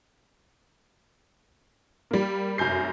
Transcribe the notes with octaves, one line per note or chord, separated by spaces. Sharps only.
G3 A#3
F1 F#2 G#5 G6 C7